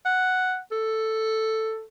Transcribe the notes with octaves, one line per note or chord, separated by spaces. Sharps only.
F#5
A4